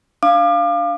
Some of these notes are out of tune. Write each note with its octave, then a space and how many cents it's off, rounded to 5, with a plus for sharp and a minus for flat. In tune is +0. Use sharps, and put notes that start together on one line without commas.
D4 +0 F5 -5 D6 +35